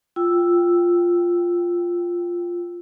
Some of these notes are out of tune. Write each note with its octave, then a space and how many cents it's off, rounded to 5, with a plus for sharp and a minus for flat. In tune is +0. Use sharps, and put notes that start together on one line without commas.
F4 +0 G5 +0 E6 +0